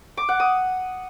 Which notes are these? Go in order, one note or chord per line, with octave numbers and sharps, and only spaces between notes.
D6
F#5
D#6